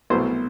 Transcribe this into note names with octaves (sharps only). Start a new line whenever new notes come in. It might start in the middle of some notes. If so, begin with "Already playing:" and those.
C2 B2 F#3 A3 C5